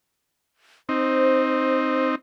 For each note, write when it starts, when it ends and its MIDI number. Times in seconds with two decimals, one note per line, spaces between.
0.89 2.15 60
0.89 2.15 63
0.89 2.06 72